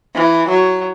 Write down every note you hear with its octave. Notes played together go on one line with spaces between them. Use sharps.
E3
F#3